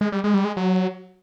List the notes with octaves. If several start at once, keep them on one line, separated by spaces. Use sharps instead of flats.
G#3
G3
G#3
G3
G#3
F#3